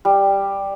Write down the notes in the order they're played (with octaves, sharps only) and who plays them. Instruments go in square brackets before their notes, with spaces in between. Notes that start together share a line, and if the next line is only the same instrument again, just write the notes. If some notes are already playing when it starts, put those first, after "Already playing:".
[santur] G3